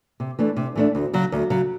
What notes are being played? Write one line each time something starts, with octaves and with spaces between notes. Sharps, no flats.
C3
E3 A3 D4
C3
E3 A3 D4
D2
C#3 F#3
D2
C#3 F#3